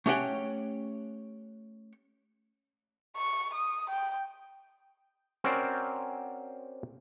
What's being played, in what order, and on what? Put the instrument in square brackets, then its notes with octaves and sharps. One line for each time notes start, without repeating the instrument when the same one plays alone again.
[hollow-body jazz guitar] A3 C#4 G4 C#5 F#5 G5
[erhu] C#6
D#6
G5
[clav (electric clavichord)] C4 C#4 F#4 A#4 C5 D5